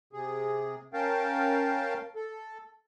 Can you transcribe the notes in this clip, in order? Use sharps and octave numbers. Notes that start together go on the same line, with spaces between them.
C3 G#4
C#4 A#4 F5 G5 A5
A4